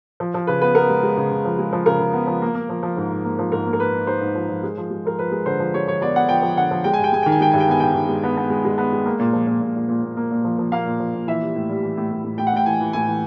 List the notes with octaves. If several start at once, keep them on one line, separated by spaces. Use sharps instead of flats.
F3
F3
C#3 B4
B3 B4
B3 A#4
G#3
G#3
C#3
C#3
F3
G#3
F3
C#3 A#4
C#3
B3
F3
A#3
A#3
F3
F3
G#2
G#2
A#3
F3
G#2 A#4
A#3
A#4
A#3 B4
D#4
D#4 C5
G#2
F3
F3
G#3
F3
G#3
F3 A#4
F3 B4
G#3
D3 C5
F3
G#3 C#5
F3 C#5
B3 D5
B3 F#5
F3 G5
F3
D3 F#5
F3
G#3 G5
G#5
G2
G5
G#3 G#5
D#3 G5
G#5
G#3 G5
G2 G#5
G5
B3 G#5
G2 G5
D#3
G#3
B3
B3
G#3
G#3
B3
G#3
A#3
A#2
F3
A#2
A#2
A#2
A#2
A#2
A#3
A#2
F3
F3
A#3 F5
A#2
F3
A#2
E3 E5
G3
A2
G3
E3
A2
A2
A2
A2 G5
F#5
A2 G5
E3 G#5
E3
A2 G#5
E3